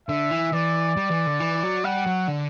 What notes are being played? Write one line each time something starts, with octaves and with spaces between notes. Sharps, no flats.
D3 E5
E3
E3 D5
G3
E3
D3
E3
F#3
G3 F#5
F#3
D3